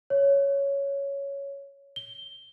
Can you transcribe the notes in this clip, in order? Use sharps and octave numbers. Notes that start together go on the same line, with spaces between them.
C#5
G7